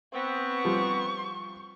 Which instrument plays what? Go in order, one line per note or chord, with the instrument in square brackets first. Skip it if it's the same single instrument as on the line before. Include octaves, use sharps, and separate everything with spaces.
[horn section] B3 C4 [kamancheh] C#6
[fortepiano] F3 G3